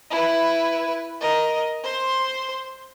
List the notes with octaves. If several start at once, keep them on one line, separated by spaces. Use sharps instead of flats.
E4 B4
A#4 D#5
C5 C6